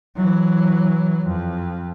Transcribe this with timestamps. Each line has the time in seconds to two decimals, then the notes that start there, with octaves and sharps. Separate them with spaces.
0.16 E3 F#3
1.25 F2